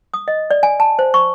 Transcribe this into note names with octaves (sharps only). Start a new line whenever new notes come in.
D#6
D#5
D5
G#5
A5
C5
C#6